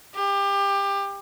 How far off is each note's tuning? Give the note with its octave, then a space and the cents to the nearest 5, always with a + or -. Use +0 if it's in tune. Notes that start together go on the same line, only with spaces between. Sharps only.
G4 +25